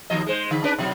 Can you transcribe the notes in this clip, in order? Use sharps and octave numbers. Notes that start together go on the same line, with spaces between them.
D#2 F3 D#5
G#3 C5
D3
C#4 D4 B4
B2 F3 F#3